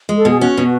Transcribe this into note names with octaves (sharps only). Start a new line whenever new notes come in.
G#3
A4
B2 G#4
C#4 F#4
B2